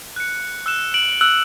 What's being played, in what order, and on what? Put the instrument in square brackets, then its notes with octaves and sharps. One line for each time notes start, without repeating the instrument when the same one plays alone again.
[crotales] F#6 C#7
E6 F#6 E7
[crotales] D7 [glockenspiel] F#7
[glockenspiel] E6 F#6 F#7